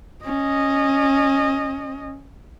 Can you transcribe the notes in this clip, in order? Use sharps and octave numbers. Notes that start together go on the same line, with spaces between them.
C#4 D#5